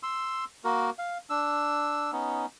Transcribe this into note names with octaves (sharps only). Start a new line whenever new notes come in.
C6 E6
A#3 F#4 A#4
F5
D4 E6
B3 C#4 D#4